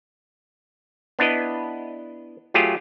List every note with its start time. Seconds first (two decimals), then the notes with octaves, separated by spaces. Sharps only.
1.19 B3 D4 E4 B4 D#5
2.54 F#3 A3 F4 G4 G#4